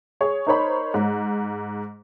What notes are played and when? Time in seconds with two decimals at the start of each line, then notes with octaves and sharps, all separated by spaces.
0.21 G#4 C#5
0.47 D#4 A#4 C5 C#5 B5
0.94 G#2